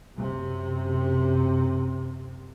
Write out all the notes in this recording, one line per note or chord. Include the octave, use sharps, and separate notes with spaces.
F#2 C3